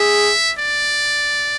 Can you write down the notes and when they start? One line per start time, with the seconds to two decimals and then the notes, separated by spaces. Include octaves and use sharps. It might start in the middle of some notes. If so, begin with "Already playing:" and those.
Already playing: G#4 E5
0.58 D5